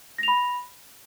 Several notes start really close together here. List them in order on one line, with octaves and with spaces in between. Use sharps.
A#6 F7 B5